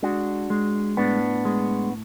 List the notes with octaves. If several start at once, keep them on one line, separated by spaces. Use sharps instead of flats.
G#3 D4 F#4
G#3
A2 B3 D4
G#3